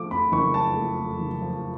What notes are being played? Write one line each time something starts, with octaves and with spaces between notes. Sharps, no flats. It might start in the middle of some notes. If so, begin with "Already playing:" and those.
Already playing: F3 A3 D6
F2 B5
F#1 C#6
F3 A5
A3
F2
F#1
F3